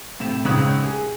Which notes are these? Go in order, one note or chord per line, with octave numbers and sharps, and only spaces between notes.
A2 C3 E7
C#2 G#2 C#3 C#5 D#6 F#6
G#4